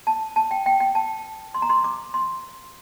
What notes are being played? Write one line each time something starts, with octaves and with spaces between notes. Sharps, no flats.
A5
A5
G5
G5
G5
A5
C6
A#5
C6
D6
C6